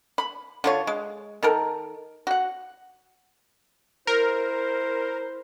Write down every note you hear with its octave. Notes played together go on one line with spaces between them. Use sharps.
B5
D3 F4 C#5
G#3
D#3 A4 A#4
F#4 F#5
E4 A#4 C5